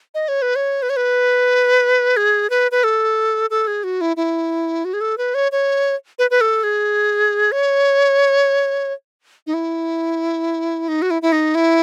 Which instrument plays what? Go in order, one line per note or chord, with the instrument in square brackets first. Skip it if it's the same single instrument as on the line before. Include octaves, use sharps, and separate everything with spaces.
[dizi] D#5
C#5
B4
C#5
B4
C#5
B4
G#4
B4
B4
A4
A4
G#4
F#4
E4
E4
F#4
G#4
A4
B4
C#5
C#5
B4
B4
A4
G#4
C#5
D#4
E4
D#4
F#4
E4
E4
D#4
E4